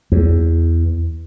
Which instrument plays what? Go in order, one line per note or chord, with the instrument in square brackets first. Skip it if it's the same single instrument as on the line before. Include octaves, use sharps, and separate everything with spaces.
[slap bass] E2